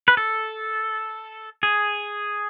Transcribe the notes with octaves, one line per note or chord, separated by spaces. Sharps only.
B4
A4
G#4